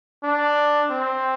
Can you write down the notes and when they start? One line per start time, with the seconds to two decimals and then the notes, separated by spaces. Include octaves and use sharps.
0.24 D4
0.90 C4